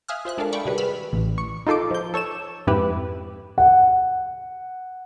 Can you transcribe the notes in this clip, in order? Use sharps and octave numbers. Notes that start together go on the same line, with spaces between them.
E5 F5 G#5 D#6 F6 F#6
F4 C5 E5 F#6
G#3 D4 A4 A#4 D5 F5
D5 G5 B5 C#6 D6
C3 D#3 G3 F#4 G#4 B4
B5 E6 F6
A1
C#6
D#4 F4 A4 C6 D6
F3 G6
A4 C#5 E6 E7
F2 G#2 E4 G4 B4
F#5